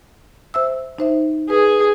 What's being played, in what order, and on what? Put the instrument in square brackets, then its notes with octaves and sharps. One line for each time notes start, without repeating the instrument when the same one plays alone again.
[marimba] C5 E5 E6
D#4 C5 E5
[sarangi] G#4 [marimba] B4